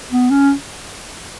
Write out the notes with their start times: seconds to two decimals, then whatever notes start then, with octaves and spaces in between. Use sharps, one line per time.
0.11 B3
0.31 C#4